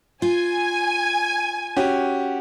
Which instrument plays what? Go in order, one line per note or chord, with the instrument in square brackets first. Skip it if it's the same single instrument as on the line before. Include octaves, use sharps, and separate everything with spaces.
[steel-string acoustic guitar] F4 [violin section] G#5
[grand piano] C#4 F#4 G4